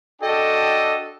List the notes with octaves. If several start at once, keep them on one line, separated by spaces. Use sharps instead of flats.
D4 F#4 A4 D#5 G5